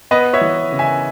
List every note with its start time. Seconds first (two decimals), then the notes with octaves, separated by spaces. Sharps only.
0.11 B3 B4 D#5
0.33 C#5 E5
0.41 E3
0.72 C#3
0.79 E5 G#5